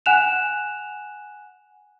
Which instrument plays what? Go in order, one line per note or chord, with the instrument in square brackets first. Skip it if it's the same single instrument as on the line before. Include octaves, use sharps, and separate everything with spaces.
[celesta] F#5 G#5 F#6 E7 F7